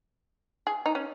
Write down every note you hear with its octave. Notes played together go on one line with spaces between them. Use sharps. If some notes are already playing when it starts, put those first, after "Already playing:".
G#4
D#4
C#4